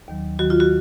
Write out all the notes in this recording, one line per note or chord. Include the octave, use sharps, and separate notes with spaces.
D#2 D#3 F#3
D#2 D#3 F#3 F#4
F4
F#4